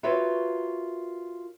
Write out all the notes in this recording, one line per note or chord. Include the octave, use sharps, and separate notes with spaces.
F4 F#4 A#4 B4 C#5 E5